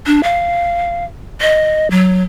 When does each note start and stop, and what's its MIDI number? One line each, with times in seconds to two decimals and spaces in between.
0.06 0.21 62
0.23 1.04 77
1.41 1.90 75
1.91 2.23 54